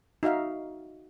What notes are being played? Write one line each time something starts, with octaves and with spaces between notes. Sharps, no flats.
D#4 F#4 E5 F5